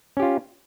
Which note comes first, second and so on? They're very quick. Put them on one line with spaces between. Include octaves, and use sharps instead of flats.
C#4 G4 F4